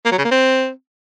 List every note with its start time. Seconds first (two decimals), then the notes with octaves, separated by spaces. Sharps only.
0.05 A#3
0.12 F#3
0.18 C#3
0.25 A#3
0.31 C4